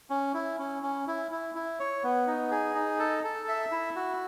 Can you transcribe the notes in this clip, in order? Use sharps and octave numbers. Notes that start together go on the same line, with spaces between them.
C#4
E4
C#4
C#4
E4
E4
E4
C#5
B3
D#4
G#4
D#4
A4
A4
E5
E4
F#4